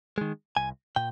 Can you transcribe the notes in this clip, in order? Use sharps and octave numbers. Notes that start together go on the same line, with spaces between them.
D#3 G#3
C2 G#5
A#2 G5